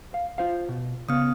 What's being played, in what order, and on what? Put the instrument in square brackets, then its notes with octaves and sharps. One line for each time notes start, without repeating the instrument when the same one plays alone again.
[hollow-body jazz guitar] F5
F4 C5 F5
B2
[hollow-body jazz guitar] C#3 [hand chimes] B3 D#6